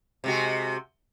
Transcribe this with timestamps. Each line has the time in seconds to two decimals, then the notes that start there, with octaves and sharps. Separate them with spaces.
0.24 C3 G#3 F#4